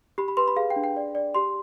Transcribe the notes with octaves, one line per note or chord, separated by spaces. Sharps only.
G4 B5
B5
B4 C6
B5
G#4 F5
G5
D4
G5
D5
D5
G4 C6